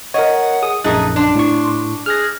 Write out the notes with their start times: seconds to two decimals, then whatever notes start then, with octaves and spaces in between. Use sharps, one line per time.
0.14 A#4 C#5 D#5 F#5
0.62 G#4 D#6
0.84 A#1 F#2 A3 D#4 G#4 F#6
1.16 D4 C6
1.35 A2 C#6
2.06 G#4 F6 F#6 A#6